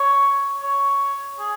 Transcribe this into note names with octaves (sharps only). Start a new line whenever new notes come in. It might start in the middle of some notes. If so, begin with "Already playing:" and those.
Already playing: C#5
C#5
G#4